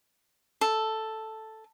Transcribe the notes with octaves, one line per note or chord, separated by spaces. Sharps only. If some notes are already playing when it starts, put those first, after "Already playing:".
A4